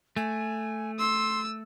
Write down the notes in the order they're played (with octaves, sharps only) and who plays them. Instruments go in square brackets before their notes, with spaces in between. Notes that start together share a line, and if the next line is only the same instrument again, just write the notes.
[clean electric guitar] A3 [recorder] G#5
[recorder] C6 [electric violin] E6